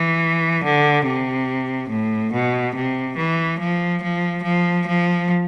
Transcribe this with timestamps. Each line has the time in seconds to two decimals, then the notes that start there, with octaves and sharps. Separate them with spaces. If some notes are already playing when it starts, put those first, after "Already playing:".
Already playing: E3
0.63 D3
1.04 C3
1.89 A2
2.32 B2
2.74 C3
3.16 E3
3.59 F3
4.01 F3
4.42 F3
4.85 F3